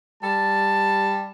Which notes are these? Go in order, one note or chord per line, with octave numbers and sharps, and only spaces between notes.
G3 A5